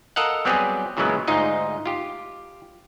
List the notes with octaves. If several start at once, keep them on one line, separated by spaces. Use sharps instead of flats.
A4 A#4 D#5 F5 F#5
F#3 G3 B3 C4 G4 G#4
A#2 C#3 E3 F#3 G#3 B3
D2 G#2 D#4 F4 D#5
F4 G4